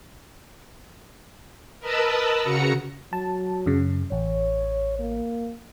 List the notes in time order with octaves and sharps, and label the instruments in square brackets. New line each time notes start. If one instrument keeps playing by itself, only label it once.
[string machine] A#4 B4 D#5 A5 B5 E6
C#3 F#4 A#5 C#7
[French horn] F#3 [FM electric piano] A5
[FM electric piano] F#2 C#3
[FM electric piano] A1 [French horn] C#5
[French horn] A#3